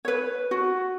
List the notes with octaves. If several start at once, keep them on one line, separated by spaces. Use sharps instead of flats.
B4 C#5
F#4